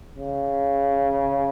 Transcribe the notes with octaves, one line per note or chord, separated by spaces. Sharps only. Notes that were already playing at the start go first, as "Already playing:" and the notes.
C#3